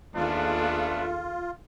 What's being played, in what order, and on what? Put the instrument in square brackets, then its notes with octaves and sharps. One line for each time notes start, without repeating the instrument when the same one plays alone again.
[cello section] D#2 G#4 A4 [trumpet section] A3 B3 D4 [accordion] F4